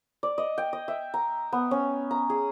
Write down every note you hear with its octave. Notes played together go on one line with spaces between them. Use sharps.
D5
D#5
G5
D#5
E5
A#5
B3
C#4
A#5
G#4